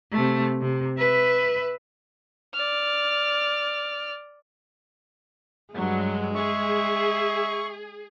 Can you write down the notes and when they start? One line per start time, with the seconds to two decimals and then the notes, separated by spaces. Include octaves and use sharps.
0.12 C3 A3
0.61 C3
0.98 B4 E5
2.54 D5 F6
5.74 G2 F#3 G#3
6.35 G#4 E5 C#6